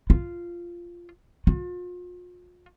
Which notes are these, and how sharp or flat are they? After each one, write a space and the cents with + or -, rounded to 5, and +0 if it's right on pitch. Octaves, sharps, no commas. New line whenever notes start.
F4 -10
F4 +40